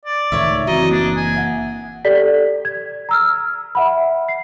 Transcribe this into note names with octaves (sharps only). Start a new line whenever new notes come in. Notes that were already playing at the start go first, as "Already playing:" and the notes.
D5
C#2 A2 D#3 C#5 E5
F#1 E3 C4 D#4 F#4 D#5
A#3 D4
G#5
E5 F#5
G4 A4 D5 B6
G#6
A#5 E6 F6
E5 F#5 B5
C7